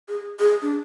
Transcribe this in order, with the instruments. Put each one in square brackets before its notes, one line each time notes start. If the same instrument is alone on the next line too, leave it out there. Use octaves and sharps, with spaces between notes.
[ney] G#4
G#4
D4